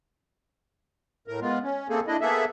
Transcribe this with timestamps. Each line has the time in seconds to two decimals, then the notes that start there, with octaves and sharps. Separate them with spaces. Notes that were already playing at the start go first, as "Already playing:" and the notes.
1.28 A2 A#4
1.41 G#3 B3 F4
1.63 C#4
1.89 A3 A#3 C4 G#4 A4
2.07 D4 E4 D#5
2.21 A#3 B3 G#4 A4 E5